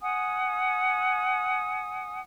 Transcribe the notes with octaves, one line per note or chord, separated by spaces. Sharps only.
F#5 G#5 D#6